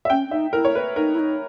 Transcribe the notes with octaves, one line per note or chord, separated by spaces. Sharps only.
E5
C#4 G5
C#4
D#4 E5
E4 A#4
C#5
B4
D#4 A#4
E4
D#4